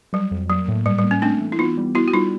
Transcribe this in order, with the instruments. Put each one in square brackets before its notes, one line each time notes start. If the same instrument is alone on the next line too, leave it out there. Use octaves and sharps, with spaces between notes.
[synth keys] F#3 [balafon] G3
[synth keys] F2
[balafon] F#3 [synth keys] A#3
[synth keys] A2
[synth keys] G#2 [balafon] G3
[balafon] G3
[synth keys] A#3
[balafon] C#4
[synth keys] A3 [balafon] C4 D4
[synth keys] E3
[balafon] E4
[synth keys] B3 [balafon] D#4 F4
[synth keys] G3
[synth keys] B3 [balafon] E4 F#4
[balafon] F#4
[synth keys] G3 [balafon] D#4 F4